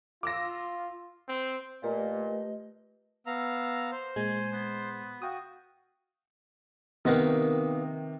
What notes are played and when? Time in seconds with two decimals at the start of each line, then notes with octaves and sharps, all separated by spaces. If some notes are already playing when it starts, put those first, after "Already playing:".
0.23 F4 D6 E6 A#6
1.28 C4
1.83 A#2 A3 G4 B4 D#5
3.27 B3 F5 A#5 E6
3.91 C5
4.16 A#2 G#3 G#5
4.52 B3
5.22 F#4 F5 G5 D#6
7.05 C3 D#3 A#3 B3 D#4